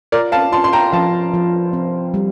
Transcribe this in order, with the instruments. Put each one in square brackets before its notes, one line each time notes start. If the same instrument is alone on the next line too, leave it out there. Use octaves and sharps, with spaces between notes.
[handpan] F4 [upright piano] A#4 D5
[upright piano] F5 A5
[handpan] F4 [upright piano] A5 C6
[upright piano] C6
G5 A#5
[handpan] F3 [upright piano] F5 A5
[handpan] F3
C4
G3